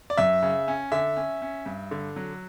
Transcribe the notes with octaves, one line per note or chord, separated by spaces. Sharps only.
D5
F#2 E5
C#3
C#4
D3 E5
C#4
C#4
G2
D3
F#3